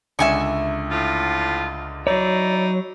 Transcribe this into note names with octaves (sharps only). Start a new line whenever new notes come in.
C#2 D3 E5 G#5 C#6
A2 F4
F#3 D#4 E4 C#5 D5